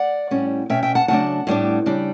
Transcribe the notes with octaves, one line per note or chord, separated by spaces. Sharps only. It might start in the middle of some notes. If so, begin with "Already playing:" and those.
Already playing: D5 F#5
A2 G3 C#4
B2 A3 C#4 E5 G5
E5 G5
F#5 A5
C#3 F#3 A3 D4 F#5 A5
A2 G3 B3 D4
C#3 G3 D4